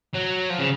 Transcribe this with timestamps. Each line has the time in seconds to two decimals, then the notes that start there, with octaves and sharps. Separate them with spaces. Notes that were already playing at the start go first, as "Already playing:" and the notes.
0.14 F#3
0.50 F3
0.59 C#3